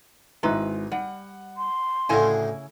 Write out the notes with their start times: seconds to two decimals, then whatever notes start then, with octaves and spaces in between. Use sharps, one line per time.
0.43 G#1 G#3 E4 B4 A#5
0.92 G3 F#5
1.57 C6
2.09 D2 A2 C#3 E4 G#5